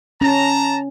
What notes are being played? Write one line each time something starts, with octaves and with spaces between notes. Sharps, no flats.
C#4 A5 A#5